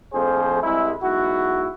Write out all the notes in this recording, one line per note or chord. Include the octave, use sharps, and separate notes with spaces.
A#1 F2 A2 F3 G#4 C5
C2 G#3 E4
B1 G#2 E4 F#4